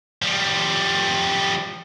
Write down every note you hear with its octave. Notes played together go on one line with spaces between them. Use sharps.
F3 G3